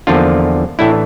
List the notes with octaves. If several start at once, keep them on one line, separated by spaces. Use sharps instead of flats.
E2 D3 F3 A#3 D4 F4
A2 E3 A3 D4 E4